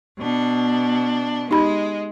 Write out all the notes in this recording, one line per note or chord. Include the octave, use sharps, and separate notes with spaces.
B2 D4
G#3 D#4 G4 B5